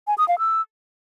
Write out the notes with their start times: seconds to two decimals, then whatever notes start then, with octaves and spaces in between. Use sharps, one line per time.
0.07 G#5
0.18 D#6
0.28 F5
0.39 E6